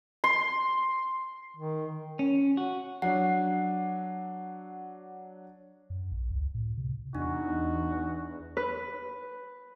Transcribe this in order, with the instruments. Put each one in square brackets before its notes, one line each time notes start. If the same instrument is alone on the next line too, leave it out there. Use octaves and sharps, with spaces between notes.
[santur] C6
[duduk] D#3
[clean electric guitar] C#4
F#4
[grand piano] F#3 D4 [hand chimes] F#5
[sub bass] F#2
A#1
C#2
A2
C3
[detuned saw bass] E2 [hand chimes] D4 [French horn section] D#4 [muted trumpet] F#4
[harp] B4